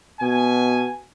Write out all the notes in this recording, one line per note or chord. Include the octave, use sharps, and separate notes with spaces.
B2 G#5